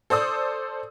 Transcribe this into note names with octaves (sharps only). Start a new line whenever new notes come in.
A4 C5 D5 D#6 E6